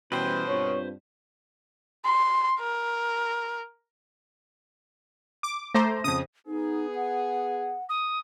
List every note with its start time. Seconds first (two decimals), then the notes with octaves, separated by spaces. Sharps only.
0.12 B2 E3 G3 C#4 B4 C5 G5
0.48 G2 C4 F4 C#5
2.05 C6
2.60 A#4
5.43 D6
5.74 A3 C5 A#5 D6 A#6
6.04 F2 C#3 D#6
6.47 B3 D#4 G#4
6.96 F#5
7.89 D#6